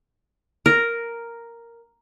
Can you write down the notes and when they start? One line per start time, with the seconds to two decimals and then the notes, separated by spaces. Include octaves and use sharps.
0.66 A#4